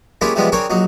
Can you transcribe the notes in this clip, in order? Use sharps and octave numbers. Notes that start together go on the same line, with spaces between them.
G#3 A#3 C#4 E4 F4 G4
C3 E3 F3 G3 G#3 B3
C4 D4 G#4 A#4 C#5 G5
A#1 F#3 D#4